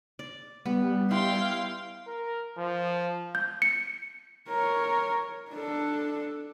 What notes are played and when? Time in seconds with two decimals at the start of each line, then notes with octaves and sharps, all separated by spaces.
0.19 D5
0.66 G3 B3
1.11 E4 F5 G5 C6
2.07 A#4
2.58 F3
3.35 G6
3.62 C#7
4.49 A#4 C#5
5.51 D4 A4